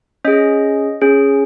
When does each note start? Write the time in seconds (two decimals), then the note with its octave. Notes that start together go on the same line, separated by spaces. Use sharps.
0.25 C#4 G#4 D#5
1.01 C#4 G#4